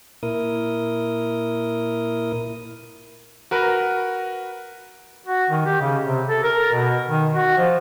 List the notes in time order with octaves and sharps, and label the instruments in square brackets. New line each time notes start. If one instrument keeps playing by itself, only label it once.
[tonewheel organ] A#2 E4 A#4 D#6
[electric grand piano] F#4 A#4 B4
[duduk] F#4
D#3
G4
C#3
C3
A4
A#4
B2
D#3
F#4
F3